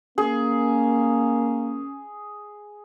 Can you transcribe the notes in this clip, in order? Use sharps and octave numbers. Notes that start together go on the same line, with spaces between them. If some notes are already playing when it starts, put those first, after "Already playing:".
A#3 C#4 G#4